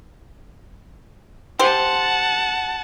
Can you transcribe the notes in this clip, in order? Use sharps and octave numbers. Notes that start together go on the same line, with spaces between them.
G4 C5 F#5 A5